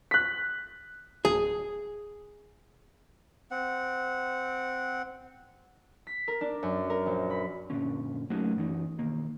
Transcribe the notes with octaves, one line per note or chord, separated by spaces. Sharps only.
F#6 B6
D1 G#4
C4 F#5
B6
A#4
D4
F#2
A#4
A#1
B5
F#2 A#2 D3 C#4
F#3 A3 A#3 C#4 D#4 F#4
F#2 E3 D#4
B1 D#3 A#3